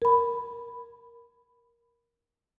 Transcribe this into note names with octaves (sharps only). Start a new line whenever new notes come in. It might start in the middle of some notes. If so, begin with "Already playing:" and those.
A#4 B5